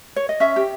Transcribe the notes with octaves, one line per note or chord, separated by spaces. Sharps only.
C#5
D#5
C#4 E5
G4